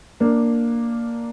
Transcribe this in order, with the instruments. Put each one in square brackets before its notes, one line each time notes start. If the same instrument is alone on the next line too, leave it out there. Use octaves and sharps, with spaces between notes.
[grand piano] A#3 D4